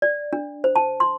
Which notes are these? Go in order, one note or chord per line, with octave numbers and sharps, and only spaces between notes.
D5
D4
C5
A5
C6